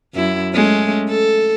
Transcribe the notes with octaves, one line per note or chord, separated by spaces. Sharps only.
F#2 E4
G#3 A3 C#4
A4